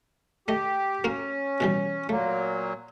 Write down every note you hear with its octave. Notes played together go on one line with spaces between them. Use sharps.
A3 G4 D#5
A#3 C#4 F#4 A#4
B2 E3 G3
A#2 F#3 A3 A#3